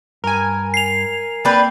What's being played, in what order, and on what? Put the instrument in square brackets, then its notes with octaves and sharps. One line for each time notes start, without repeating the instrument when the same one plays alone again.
[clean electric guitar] G2 [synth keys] A#4 G#5
[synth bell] C7 F7
[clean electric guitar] A#3 C4 G5 [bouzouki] D4 B4